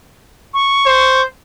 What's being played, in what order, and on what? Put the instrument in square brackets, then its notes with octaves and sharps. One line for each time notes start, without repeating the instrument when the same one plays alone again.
[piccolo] C#6
[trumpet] C5